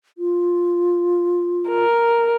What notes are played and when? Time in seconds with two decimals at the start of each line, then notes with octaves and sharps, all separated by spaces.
0.18 F4
1.69 A#4